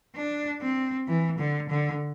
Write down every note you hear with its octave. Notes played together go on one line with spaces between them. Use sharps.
D4
C4
E3
D3
D3